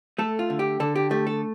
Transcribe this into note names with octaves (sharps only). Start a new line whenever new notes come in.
A3 A4
F4
D3
G4
D3 A4
G4
A3 G4
A4